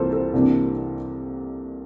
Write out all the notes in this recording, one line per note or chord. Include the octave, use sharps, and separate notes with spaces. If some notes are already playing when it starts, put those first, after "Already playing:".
Already playing: C2 C3 E3 A#3 F4 A4 C5
A4 C5
C2 C3 E3 A#3 D4